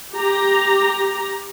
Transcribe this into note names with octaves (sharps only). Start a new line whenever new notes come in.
G4 A#5